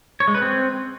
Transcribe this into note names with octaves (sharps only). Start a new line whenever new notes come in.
C#5
G#3
B4
C4